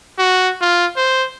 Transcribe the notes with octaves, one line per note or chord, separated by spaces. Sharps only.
F#4
F4
C5